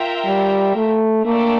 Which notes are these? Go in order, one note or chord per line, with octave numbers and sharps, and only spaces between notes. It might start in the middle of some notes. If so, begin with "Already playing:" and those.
Already playing: F4 A#4 E5 G5
G3
A3
A3 A#3 D4 A4 D5 G5